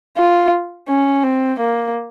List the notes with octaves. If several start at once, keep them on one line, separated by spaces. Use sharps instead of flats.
F4
C#4
C4
A#3